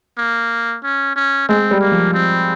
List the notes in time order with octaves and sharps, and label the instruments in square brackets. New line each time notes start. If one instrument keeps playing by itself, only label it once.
[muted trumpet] A#3
C#4
C#4
[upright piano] G#3 [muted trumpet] C4
[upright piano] G3
[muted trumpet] A#3
[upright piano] F3
[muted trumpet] C4